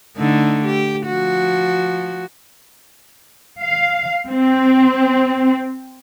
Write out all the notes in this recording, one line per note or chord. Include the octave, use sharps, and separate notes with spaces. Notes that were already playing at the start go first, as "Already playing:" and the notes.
D3 A3 D#4
G4
F3 F#4
F5
C4